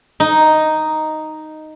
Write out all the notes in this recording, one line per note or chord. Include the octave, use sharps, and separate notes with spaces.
D#4